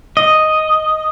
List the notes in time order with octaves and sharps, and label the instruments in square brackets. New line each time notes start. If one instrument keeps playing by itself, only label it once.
[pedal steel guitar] D#5